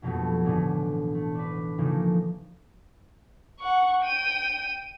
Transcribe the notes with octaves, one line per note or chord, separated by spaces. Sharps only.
A#1 F2 B2 F#3 G3 A3
A1 B2 D3 E3 A3
A3
D4 B4
C#3 E3 F3 A3 A#3 D#4
F#5 C#6
G5 D#7